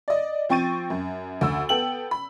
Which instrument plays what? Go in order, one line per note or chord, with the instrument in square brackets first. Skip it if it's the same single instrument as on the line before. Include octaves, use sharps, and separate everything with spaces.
[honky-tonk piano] D5 D#5
F3 C4 G5 C#6 A6 D#7
F#2
D2 E6
B3 A4 G5 F#7
B5